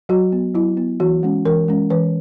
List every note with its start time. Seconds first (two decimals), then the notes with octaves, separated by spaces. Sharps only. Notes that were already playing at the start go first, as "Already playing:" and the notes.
0.09 F#3 F#4
0.32 B3
0.55 F#3 E4
0.77 B3
1.00 E3 F#4
1.23 G#3 C#4
1.45 E3 A#4
1.68 G#3 C#4
1.90 E3 B4